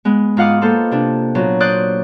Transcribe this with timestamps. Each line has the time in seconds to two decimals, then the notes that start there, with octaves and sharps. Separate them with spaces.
0.05 G#3 B3
0.37 G#2 F4 F5 F#5 D6 D#6
0.61 A#3 F4 A4 B4 C5
0.91 C3 D4
1.35 A#2 F#3 B3
1.60 C5 D5 D#6 F#6